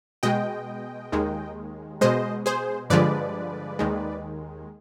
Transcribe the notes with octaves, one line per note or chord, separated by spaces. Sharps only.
B2 G#3 D#5 G5
D#2 D#3 G#3
B2 G#3 C5 D#5
G#4 C5
G2 D3 F3 G#3 B4 D5
D#2 D#3 G#3